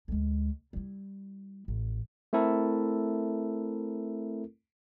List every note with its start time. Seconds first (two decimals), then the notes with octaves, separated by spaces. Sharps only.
0.08 D2 G#3
0.73 G3 E4
1.68 A1
2.33 A3 C4 E4 A4 A#4